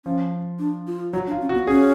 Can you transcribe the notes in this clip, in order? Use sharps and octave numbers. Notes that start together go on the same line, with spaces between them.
F3 C#4
D4
F4
F#3 F#4
D4
F4
C#4
F#4
B3
C#4 G#4